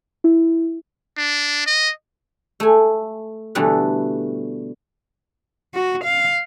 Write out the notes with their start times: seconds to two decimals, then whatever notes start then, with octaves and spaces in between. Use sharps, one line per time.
0.24 E4
1.17 D4
1.67 D#5
2.60 A3 G#5
3.55 B2 D3 E3 G3 A3
5.74 F#4
6.05 F5